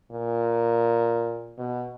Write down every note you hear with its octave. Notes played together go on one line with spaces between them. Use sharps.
A#2
B2